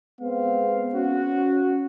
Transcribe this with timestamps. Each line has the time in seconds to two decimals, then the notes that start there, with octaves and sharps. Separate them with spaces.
0.21 G#3 B3 C4 F5
0.94 C#4 F#4